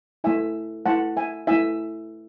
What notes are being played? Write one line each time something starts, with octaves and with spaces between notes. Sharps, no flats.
A3 E4 E5 G#5
A3 E4 F#5 A5
E5 G#5
A3 E4 E5 G#5